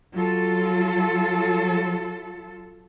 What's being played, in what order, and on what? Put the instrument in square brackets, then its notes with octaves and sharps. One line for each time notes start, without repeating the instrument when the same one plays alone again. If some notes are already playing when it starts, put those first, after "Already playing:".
[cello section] F#3 F4 A4